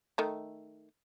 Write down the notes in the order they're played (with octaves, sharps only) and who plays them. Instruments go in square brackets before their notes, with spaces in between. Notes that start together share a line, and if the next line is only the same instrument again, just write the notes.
[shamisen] D#3 A3